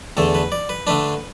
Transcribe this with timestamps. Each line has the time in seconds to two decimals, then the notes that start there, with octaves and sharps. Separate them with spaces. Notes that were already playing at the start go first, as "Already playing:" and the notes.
0.17 E2 D3 A3 A4
0.34 B4
0.52 D5
0.69 B4
0.87 D3 A3 D4 B4